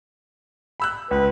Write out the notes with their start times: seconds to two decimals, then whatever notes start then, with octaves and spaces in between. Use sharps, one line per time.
0.80 B5 E6 F#6
1.11 C#2 B4